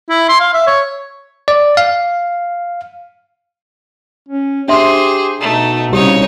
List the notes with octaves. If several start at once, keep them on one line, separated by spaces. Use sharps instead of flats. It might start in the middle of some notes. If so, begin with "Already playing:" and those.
E4
C6
F5
E5
C#5
D5
F5
C#4
D4 G4 G#4 C5 E5 C6
B2 A3 D#4
C2 C#3 D#4 G4 C#5